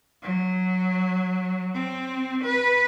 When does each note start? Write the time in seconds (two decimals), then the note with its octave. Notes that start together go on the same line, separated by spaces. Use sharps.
0.23 F#3
1.75 C4
2.44 B4